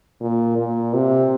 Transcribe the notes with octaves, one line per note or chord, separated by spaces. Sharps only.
A#2
A#2
C3